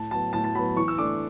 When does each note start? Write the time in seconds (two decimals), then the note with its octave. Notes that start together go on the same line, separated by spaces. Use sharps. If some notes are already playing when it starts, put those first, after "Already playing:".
Already playing: A2 A5
0.11 F#3 B3 A5
0.33 A2 A5
0.44 A5
0.55 F#3 B3 B5
0.76 E3 C#6
0.88 E6
0.98 A3 D4 D6